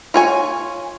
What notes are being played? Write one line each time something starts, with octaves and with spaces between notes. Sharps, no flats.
F4 C#5 G#5